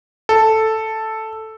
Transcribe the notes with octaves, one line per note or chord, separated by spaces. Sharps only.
A4